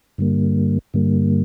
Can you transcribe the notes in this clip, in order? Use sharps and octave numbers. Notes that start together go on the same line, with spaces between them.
G2 D3 G3 A#3
G2 D3 G3 A#3